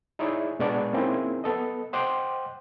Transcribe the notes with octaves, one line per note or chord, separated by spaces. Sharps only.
D#4 E4 G#4 C#5 D5
A#2 G#3 B3 D4 D5 C#6
A#3 C4 C#4 D#4 E4 G#4
B3 A4 D#5
C5 D#5 F#5 G5 C6 D6